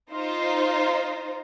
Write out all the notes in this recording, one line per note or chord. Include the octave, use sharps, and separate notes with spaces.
D#4 F4 C5